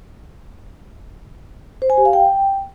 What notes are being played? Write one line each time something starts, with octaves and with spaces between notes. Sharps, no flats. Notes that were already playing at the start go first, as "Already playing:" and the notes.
C5
G#5
G4
F5
G5